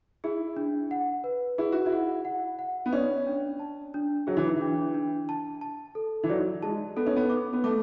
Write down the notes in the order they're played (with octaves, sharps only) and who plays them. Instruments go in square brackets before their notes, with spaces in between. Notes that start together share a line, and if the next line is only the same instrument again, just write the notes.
[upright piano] E4 [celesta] G#4
[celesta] D4
F#5
B4
[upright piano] E4 [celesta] G#4
[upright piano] F#4
E4
[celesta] F#5
F#5
F#5
[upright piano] B3
[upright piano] C#4 [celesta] D5
[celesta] D4
A5
D4
[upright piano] F#3 [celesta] G#4
[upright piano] E3
E3
[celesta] D4
D4
A5
A5
A4
[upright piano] E3
[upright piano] F#3 [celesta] D5
[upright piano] G#3 [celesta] A5
[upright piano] B3 [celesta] A4
[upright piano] C#4
B3
[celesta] D6
[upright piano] B3
[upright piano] A3 [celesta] D6